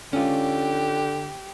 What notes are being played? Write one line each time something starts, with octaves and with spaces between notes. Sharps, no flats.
D3 C#4 F4 G4